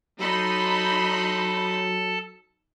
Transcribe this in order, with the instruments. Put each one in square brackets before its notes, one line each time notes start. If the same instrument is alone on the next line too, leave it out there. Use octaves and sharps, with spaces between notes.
[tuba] F#3 [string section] D#4 B5 C6 [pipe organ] A4 A5